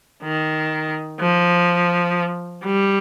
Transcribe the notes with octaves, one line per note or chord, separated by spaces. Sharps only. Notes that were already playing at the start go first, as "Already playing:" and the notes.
D#3
F3
G3